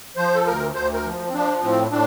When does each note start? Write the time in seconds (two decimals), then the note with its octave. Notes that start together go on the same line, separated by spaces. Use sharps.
0.16 F3 C5
0.35 A4
0.46 D2 A#4
0.74 D2 C5
0.94 A#4
1.04 F3
1.28 C4
1.33 F3 D4
1.62 A2 C4
1.91 A2 D4